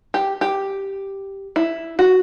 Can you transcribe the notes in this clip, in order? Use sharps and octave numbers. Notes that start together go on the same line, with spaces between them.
G4
G4
E4
F#4